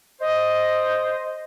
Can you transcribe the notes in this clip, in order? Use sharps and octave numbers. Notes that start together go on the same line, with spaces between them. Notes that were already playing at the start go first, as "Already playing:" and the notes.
C5 D#5